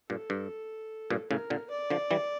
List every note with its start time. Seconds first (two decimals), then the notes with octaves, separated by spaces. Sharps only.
0.10 G2 A#2 A4
0.30 G2
1.10 G2 A#2
1.30 A2 C#3 A#4
1.50 A#2 D3
1.70 D5
1.90 D3 F3
2.11 E3 G3